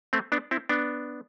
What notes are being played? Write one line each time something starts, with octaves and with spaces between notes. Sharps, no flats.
A3 C4
B3 D4
C4 E4
B3 D4